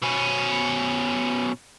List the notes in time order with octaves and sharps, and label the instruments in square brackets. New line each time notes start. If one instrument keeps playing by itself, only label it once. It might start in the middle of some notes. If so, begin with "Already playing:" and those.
[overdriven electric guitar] B2 C#4